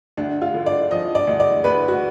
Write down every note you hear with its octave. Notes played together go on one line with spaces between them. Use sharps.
D2 D4
F4
D3
D5
F3 D#5
D5
D2
D5
D2 B4
F#4